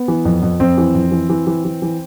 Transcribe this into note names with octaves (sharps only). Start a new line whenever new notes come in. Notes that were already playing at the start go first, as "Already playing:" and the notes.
Already playing: B3
E3
F2
F2
F2 C4
E3
F2
E3
E3
E3
E3
E3